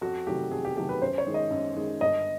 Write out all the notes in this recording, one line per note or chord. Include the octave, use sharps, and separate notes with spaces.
F2 F#4
C3 D#3 F#3 A3 G4
F2 G#4
G4
C3 D#3 F#3 A3 G4
B4
F#2 C5
C#5
D#3 G#3
D#5
F#2
D#3 G#3
G1 D#5